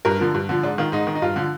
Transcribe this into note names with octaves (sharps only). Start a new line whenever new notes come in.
G2 A#4
D3 F3
G2
D3 F3
G#2 D4
D#3 F4
G#2 D#4
D#3
D#4
G2 F4
D3 F3